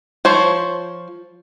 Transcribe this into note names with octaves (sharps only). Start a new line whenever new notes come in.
F3 C5 C#5